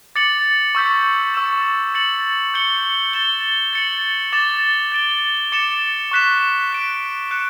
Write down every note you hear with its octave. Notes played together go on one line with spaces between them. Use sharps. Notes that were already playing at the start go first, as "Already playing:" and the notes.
D6 A6 C#7 F#7
C#6 E6 G6 B6
C#6 E6 A6 E7
A6 C#7 F#7
G6 C#7 G7
A6 E7 G7
A6 C#7 F#7
D6 A6 E7 G7
A6 D7 G7
D6 A6 C#7 E7
C#6 F#6 B6 E7
F#6 B6 D7
F#6 C#7 E7